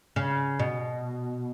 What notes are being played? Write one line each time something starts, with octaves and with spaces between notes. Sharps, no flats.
C#3
B2